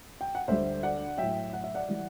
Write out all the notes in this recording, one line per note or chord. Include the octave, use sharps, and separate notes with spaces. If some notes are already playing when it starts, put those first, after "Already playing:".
G5
F#5
D2 D3 G3 C5 E5
D5 F#5
A2 F#3 E5 G5
F#5
E5
D5 F#5
E3 G3